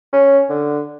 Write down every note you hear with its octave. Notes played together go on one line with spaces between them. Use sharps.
C#4
D3